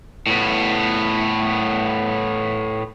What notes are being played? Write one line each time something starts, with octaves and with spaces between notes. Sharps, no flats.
A2 B3